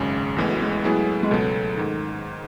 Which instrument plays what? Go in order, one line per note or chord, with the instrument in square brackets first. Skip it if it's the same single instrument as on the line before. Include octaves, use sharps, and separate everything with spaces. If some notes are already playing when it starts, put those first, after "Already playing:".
Already playing: [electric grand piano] G#1 F#2 C#3 G#3
[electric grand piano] A1 A2 E3 B3 [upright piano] G#3
[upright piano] F#3
G#3
[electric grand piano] A2 F#3 B3 E4 G#4
[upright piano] G#3
[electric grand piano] C#2 B2 F#3 B3 [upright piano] A3
[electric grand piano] G#2 D#3